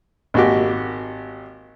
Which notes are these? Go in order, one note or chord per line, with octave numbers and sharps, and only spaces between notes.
G#1 A#3 F#4 G4